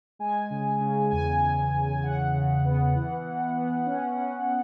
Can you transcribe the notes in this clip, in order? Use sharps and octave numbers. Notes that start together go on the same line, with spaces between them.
G#3 G#5
C#3
C#3
E2 G#5
E2
E2
C#3 F#5
C#3
B3
E3
E3
B3
C#4
C#4